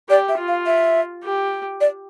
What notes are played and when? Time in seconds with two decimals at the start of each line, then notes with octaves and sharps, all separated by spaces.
0.09 G4 D5
0.29 E5
0.38 F4
0.48 F5
0.66 E5
1.24 G4
1.81 D5